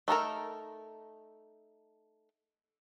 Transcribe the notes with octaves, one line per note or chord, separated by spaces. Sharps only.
A3 D#4 A4 A#4